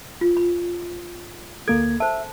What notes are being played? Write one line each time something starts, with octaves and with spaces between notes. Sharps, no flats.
F4
B5
D2 A#3 A4 G#6
C5 E5 A5